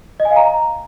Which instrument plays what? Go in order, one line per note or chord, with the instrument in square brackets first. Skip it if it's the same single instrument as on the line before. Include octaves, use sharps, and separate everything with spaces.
[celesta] D#5
G#5
F5
A#5